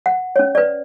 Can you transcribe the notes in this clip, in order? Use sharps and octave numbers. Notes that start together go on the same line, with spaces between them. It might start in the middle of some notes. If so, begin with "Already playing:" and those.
F#5
C#4 C#5
B4 D5